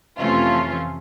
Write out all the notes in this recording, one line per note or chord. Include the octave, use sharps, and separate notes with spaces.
F2 C3 E3 A3 C#4 F4